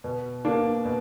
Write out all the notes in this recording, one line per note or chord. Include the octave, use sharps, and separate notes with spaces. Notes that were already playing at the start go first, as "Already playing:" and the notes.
B2
A#3 D4
B2